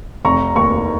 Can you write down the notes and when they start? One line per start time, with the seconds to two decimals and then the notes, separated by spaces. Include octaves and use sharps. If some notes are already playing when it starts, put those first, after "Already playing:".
0.25 F1 A#5 C#6
0.55 D#2 A#5 C#6